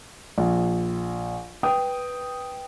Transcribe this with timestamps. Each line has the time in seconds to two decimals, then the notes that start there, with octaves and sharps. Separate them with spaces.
0.38 A#1
1.63 B4 G5 D#6